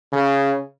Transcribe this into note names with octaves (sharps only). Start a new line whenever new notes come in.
C#3